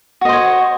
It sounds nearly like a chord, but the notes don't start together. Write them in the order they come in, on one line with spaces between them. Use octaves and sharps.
F#4 D#5 C5 C#5